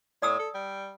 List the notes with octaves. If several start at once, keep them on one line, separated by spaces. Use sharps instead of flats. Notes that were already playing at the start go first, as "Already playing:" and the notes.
A2 D5 D#6 E6
A4
G3